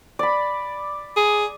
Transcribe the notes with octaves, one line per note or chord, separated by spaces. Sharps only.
D5 B5
G#4